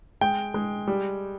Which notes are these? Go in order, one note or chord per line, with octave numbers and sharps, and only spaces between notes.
G#3 G5
G#3
G3